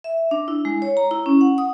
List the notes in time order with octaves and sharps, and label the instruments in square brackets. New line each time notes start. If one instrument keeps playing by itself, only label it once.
[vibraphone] E5
D4
E4
G#3
C#5
A#5
E4
C#4
F#5
D#6